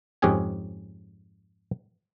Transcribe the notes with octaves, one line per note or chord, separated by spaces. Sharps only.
F2 G#2 C#4 G4 G#4 G#5